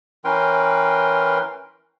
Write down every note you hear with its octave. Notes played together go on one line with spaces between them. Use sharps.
E3 C#4 A#4 B4 G5 C6